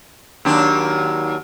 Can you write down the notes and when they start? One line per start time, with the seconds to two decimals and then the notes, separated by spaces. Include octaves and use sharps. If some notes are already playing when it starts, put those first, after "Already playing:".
0.45 D#2 F#3 D4